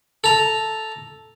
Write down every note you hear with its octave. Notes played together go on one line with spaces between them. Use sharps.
A4 A#5